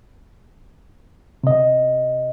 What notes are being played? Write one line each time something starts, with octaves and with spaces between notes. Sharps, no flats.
C3 D#5